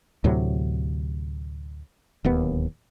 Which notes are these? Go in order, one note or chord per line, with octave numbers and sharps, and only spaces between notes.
D2 A2 C3 F#3
D1 D#2 B3